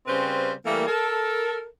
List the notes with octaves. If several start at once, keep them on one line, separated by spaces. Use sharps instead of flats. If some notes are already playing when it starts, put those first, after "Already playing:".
C#3 G3 C4 C#4 B4 C5
E3 G3 A3 A#3
A4 A#4